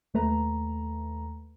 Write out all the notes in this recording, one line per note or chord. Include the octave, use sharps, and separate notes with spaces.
D#2 A3 B4 A#5